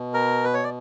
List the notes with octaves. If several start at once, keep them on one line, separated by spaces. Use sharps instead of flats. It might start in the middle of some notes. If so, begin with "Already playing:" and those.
Already playing: B2
A#4
B4
C#5
D5